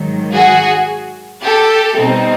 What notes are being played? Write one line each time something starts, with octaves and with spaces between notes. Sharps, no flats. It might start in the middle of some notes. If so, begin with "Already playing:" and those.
Already playing: G#2 D#3 F#3
F#4 G#4
G4 A4
B2 G3 C4 D#4